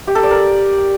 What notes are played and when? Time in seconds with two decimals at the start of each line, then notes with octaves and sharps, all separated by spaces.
0.07 G4
0.15 A4
0.23 D5
0.31 A#4